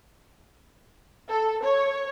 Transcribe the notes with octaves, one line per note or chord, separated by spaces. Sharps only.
A4
C#5